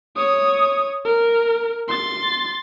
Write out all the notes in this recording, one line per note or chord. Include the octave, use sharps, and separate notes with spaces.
C#5 D#6
A#4
C6 A6